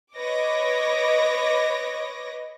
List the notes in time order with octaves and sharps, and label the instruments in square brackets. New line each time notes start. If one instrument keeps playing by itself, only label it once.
[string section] B4 C#5 D#5 D6 A#6